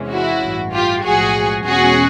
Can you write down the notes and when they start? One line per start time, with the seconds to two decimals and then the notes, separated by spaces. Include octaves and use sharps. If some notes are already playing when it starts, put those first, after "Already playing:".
Already playing: E2 C3 E3 G#3 C#4
0.11 E4 F#4
0.43 A1 G2 E3
0.73 F4 G4
1.04 B1 A2 F3 G#3 F#4 G#4
1.66 E2 B2 G#3 C#4 F#4 G#4